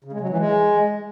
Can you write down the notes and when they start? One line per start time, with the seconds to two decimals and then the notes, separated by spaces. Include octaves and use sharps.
0.04 C#3
0.13 G#3
0.21 F#3
0.29 E3
0.38 G#3